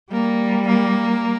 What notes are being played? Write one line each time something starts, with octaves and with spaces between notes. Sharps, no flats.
G3 A#3
A#3